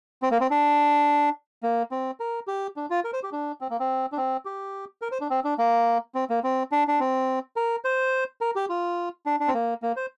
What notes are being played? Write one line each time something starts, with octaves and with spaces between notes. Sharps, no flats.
C4
A#3
C4
D4
A#3
C4
A#4
G4
D4
F4
A#4
C5
G4
D4
C4
A#3
C4
D4
C4
G4
A#4
C5
D4
C4
D4
A#3
C4
A#3
C4
D4
D4
C4
A#4
C5
A#4
G4
F4
D4
D4
C4
A#3
A#3
C5